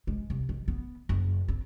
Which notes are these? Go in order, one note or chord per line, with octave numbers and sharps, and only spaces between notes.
G#3
C2
D#3
B3
F#1
C4